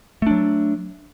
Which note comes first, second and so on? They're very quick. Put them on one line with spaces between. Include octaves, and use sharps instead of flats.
A3 D4 F#3